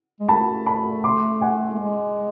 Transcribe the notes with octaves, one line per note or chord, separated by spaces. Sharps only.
G#3
A3 A5 B5
A5 B5
C6 D6
F#5 G#5
A3
G#3